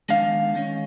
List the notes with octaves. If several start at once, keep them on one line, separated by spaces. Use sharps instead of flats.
D#3 G#3 B3 D4 F5
D#3 G#3 C#4